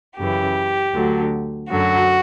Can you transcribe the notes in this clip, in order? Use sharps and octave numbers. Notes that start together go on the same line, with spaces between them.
F#2 C#3 E3 G4
D2 D3 F#3
F#2 D3 F#3 F#4